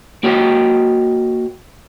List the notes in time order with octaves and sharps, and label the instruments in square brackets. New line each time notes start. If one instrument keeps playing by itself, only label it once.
[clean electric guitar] A#3 F#4 C#5 D#5 G5